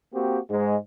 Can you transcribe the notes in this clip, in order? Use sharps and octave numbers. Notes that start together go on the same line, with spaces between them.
A#3 C4 F#4 G4
G#2 G#3